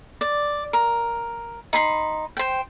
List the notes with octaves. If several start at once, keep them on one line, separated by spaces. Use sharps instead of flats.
D5
A#4
D#4 B5 C6
C5 G5